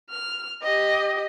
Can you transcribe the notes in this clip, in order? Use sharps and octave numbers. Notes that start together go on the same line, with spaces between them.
F6
G4 D#5